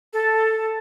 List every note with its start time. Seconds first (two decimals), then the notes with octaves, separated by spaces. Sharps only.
0.13 A4